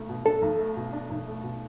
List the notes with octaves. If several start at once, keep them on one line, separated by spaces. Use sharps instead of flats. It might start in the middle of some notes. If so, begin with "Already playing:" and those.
Already playing: B1 A3
B2
D4 A4
B1
A3
B2
D4
B1
A3
B2